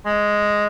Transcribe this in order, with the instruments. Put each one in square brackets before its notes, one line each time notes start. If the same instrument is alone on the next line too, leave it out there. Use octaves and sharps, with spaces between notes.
[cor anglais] G#3